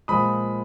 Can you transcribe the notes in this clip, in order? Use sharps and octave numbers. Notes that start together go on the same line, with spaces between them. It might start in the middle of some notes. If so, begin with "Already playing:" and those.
A#2 F3 G#3 B5 D#6